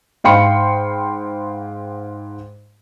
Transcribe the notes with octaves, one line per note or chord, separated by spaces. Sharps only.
G#2 F5 G5 B5 C6 C#7